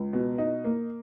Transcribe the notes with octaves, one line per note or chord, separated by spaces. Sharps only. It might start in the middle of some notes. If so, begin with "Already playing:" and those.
Already playing: C#2
B2
D#4
A#3